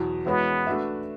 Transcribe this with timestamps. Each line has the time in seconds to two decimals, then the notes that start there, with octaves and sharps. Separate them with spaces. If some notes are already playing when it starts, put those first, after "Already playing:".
Already playing: E2 B2 F#3
0.26 E3 G#3 B3 C#4 F#4 B4
0.67 A3 D4 F#4 B4 E5